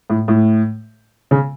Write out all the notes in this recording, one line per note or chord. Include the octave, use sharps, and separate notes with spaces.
A2
A2
C#3